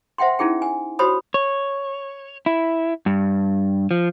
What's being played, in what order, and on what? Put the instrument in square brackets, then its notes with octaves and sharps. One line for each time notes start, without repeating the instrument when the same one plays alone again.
[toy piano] C5 E5 F#5 G5 C6
C#4 D#4 E4 G#4 G5
G#5
F#4 G4 C5 C#5 B5 D#6
[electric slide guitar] C#5
E4
G2
F3